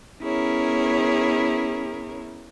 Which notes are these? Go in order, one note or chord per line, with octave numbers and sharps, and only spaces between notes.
B3 C#4 E4 G#4 A#4 C#5